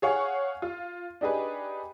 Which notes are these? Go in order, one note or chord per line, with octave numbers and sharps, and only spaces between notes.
G#4 C#5 F5 F#5 C#6
F4
D4 D#4 G4 G#4 B4